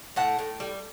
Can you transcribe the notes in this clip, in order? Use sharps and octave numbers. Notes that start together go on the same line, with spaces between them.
A2 F#5 A5
A2
G3